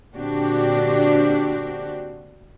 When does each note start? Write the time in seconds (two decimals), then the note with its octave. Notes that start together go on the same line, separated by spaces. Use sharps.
0.15 A#2 D3 C4 D4 F#4 G4